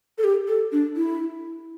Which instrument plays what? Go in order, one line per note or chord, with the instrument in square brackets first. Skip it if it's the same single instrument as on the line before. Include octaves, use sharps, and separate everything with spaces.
[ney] A4
G4
A4
D4
E4